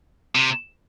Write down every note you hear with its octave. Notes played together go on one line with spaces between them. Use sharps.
C3